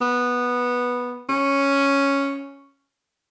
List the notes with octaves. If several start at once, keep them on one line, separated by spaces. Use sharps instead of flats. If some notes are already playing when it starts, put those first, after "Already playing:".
B3
C#4